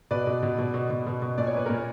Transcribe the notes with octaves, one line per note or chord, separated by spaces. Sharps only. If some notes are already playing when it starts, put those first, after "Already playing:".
B2 B4 D5
B2
B2
B2
B2
B2
B2
B2
A#2 D5
C#5
A#2 B4
A#2 A#4 C#5